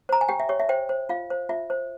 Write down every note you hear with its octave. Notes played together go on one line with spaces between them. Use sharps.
C5 A#5
G#5
G4 G5
E5
G4 C#5
E5
C5 G5
C5
F4 F5
C5
F4 E5
C5